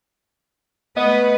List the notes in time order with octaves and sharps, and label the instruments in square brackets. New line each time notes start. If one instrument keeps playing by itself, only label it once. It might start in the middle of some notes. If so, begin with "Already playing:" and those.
[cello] A3 B4 [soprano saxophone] B3 [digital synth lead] D#5